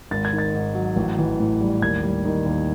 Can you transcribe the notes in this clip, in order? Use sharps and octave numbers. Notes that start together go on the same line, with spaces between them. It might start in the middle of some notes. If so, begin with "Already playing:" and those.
G#1 A6
G#6
D#3
A6
G#2
F#3
A1
E3
A2
G3
D#2 G#6
G3
D#3
D#2